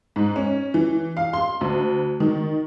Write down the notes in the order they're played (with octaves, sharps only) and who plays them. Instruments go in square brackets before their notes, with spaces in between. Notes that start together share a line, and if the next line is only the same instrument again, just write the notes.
[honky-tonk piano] G#2
C#4
E3
F5
C6
D2
D#3